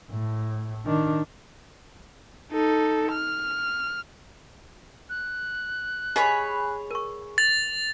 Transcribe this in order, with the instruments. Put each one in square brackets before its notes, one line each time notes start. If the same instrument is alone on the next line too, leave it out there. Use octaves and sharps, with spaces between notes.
[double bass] A2
D#3 D4
[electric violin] D#4 A4
F6
[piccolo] F#6
[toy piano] G4 D#5 G#5 [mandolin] G#4 C#5 B5
[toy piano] A#4 C#6
[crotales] A6 [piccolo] F7